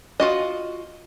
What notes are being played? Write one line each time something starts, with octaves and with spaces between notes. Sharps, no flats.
F4 F#4 D#5